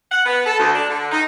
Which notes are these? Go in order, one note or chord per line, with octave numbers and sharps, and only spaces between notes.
F#5
B3
A4
D2
D4
D3
D#4